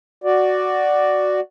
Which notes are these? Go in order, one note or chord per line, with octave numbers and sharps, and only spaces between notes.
F#4 D5